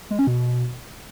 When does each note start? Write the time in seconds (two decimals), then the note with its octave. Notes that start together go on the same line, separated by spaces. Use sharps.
0.11 G#3
0.19 C#4
0.27 B2